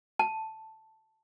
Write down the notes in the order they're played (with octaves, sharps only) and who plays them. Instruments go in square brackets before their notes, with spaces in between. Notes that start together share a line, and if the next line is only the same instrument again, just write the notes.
[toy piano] A5